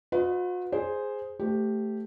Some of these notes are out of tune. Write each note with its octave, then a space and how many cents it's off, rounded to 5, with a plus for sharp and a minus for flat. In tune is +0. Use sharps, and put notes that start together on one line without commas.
F#4 -45 B4 +30 D#5 +15
G#4 +0 C5 +0
A3 +0 G4 +0 C5 -30